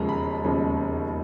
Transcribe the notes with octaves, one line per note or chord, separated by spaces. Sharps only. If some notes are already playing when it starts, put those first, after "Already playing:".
Already playing: E1 D#2 C#3 F3 G#3 A#5
B5
E1 D#2 C#3 F3 G#3